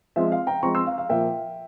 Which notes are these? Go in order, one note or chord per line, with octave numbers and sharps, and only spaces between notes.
F3 G#3 C4 E5
F5
G5 A#5
F3 G#3 C4 A#5 C#6
C6 E6
F5
F5
A#2 F3 A#3 E5 G5